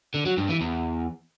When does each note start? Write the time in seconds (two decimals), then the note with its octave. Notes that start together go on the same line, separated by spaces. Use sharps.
0.14 D3
0.26 F#3
0.37 G2
0.49 E3
0.61 E2